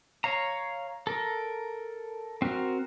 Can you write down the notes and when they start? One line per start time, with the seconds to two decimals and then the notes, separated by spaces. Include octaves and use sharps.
0.24 C#5 F5 A#5
1.07 A4 A#4
2.42 C4 F#4 A#4